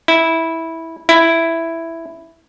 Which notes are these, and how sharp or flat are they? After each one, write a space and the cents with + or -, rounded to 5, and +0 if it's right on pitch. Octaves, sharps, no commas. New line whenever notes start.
E4 -10
E4 +5